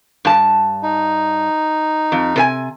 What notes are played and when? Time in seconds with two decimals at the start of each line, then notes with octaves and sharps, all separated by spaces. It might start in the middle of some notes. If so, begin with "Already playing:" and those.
0.25 G2 A5
0.83 D#4
2.12 F2
2.36 C3 B4 G#5